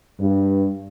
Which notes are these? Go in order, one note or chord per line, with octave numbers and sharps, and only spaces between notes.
G2